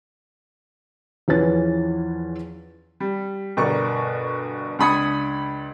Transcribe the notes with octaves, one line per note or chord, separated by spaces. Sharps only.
E2 E3 F3 C#4 B4 A6
G3
G1 B2 A#4 D5 C#6
C#2 D4 B5 D#6 G#6 C#7